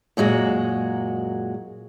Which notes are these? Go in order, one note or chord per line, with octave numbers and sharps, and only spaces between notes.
F#2 A#2 G#3 F#4